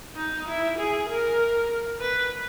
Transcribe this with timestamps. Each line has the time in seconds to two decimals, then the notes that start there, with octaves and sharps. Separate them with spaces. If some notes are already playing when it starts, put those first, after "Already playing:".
0.16 D#4
0.48 E4
0.78 G#4
1.08 A#4
2.00 B4